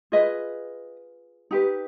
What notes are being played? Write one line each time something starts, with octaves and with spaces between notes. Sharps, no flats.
F4 G#4 B4 D#5
D#4 G4 B4